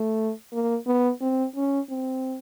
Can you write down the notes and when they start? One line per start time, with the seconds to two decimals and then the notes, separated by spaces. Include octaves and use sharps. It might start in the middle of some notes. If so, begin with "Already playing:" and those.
Already playing: A3
0.53 A#3
0.87 B3
1.21 C4
1.56 C#4
1.90 C4